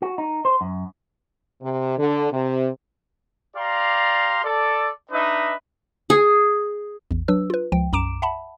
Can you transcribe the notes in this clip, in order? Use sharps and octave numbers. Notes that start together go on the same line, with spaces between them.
F#4
D#4
C5
F#2
C3
D3
C3
G4 D5 F5 A#5 C6
A4 D5
D4 D#4 B4 D#5 E5
G#4
A1 E2
F#3 D4 B4 E6
F4 B4
C#2 F3 G5
B1 F#2 A#5 D6 D7 E7
E5 F#5 A5 B5